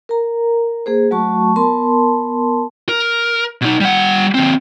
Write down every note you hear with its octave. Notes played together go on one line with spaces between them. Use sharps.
A#4 A#5
A#3 G#4 C5
F#3 A3 F#4 A5 C#6
B3 A#4 A5 C6
A#4
B2 D#4
G3 F#5
D#2 C4